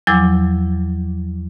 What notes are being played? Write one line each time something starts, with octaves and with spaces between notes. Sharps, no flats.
E2 F3 F#3 D6 E6